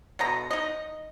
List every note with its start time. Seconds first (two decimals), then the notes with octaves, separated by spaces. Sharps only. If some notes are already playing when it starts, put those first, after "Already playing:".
0.19 B2 D3 D#5 A#5
0.51 D#4 D#5